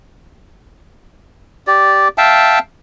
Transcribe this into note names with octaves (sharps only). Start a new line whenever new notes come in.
G4 D5
E5 F5 G5 A5